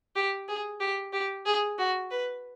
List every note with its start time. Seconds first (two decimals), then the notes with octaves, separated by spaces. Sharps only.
0.16 G4
0.48 G#4
0.80 G4
1.13 G4
1.46 G#4
1.79 F#4
2.11 B4